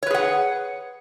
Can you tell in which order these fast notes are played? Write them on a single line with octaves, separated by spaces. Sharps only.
C#5 B4 G#4 F#5